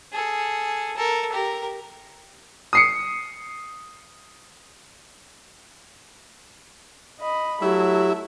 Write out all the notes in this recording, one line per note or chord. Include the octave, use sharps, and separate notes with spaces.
G#4 A4
A4 A#4
G4 A#4
D#6 C7 C#7
D#5 B5
F#3 A3 E4 G4